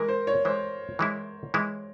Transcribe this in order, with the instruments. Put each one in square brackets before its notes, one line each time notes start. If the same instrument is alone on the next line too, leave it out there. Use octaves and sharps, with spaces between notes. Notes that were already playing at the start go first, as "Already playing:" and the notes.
Already playing: [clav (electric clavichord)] E3 G#3 E4 [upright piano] A#4
[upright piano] C5
C#5
[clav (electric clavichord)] E3 G#3 E4 [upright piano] C5
[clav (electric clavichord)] E3 G#3 E4
E3 G#3 E4